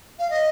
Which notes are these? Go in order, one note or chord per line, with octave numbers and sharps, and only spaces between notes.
F5
D#5